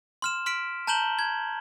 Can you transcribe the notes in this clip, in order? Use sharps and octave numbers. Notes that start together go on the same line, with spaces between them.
C6 F6 E7
C6 F6 B6 D7
A5 A#5 G6 E7 F#7 G7
G#6